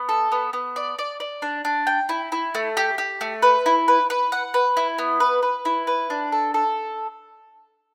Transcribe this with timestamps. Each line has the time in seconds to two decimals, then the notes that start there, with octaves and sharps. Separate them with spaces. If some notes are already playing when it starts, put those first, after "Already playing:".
Already playing: B3
0.09 A4
0.32 B3
0.53 B3
0.76 D5
0.99 D5
1.20 D5
1.42 D4
1.65 D4
1.87 G5
2.09 E4
2.32 E4
2.55 A3
2.77 G4
2.98 G4
3.21 A3
3.42 B4
3.66 E4
3.88 B4
4.10 B4
4.32 F#5
4.54 B4
4.77 E4
4.98 B3
5.20 B4
5.43 B4
5.65 E4
5.87 B4
6.10 D4
6.32 A4
6.54 A4